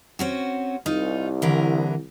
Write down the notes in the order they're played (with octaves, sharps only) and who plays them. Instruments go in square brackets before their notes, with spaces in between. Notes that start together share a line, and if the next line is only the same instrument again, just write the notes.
[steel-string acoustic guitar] C4 C#4 F#4
[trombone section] C2 [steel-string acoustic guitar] D#4 F4
[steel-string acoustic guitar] D3 E3 A#4